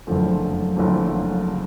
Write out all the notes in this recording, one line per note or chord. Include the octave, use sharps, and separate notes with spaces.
F#1 F#2 D3 F3 A3
F#1 F#2 D3 F3 A3
C#3